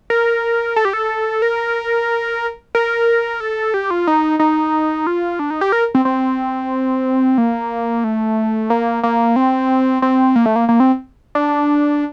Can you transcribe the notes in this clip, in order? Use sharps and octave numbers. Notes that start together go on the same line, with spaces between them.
A#4
A4
G4
A4
A#4
A#4
A4
G4
F4
D#4
D#4
F4
D4
D#4
G4
A#4
C4
C4
A#3
A3
A#3
A#3
C4
C4
A#3
A3
A#3
A#3
C4
D4